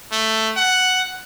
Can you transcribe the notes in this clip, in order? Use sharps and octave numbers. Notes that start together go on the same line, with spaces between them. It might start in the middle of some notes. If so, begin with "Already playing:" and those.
A3
F#5